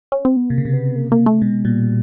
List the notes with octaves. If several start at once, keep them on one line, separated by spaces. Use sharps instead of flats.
C#4
C4
B3
C3 A#3
C#3
C3
B3
A#3
A#3
A3
B2 G#3
A#2 G3